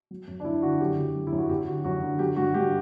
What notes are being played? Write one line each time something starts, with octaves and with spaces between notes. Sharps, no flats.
F#3
F#2
D4
F#2 E4
D3 F#4
F#2 G4
C#3
F#3
E4
F#2
F#4
F#2 G4
D3 F#4
F#2 F#4
D3
F#3 G4
G2 F#4
G2 G4